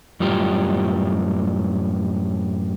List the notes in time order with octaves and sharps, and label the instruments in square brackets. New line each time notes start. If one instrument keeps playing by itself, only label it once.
[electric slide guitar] F#2 A2 G3 F4 G4